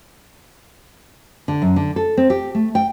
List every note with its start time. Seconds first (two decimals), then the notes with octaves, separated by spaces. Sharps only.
1.48 D3
1.62 F#2
1.76 D3
1.96 A4
2.17 C4
2.30 G4
2.55 A3
2.75 G5